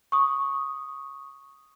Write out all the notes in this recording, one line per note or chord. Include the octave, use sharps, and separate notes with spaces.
C#6 D#6